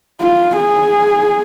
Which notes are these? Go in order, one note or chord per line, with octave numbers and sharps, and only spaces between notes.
F4
G#4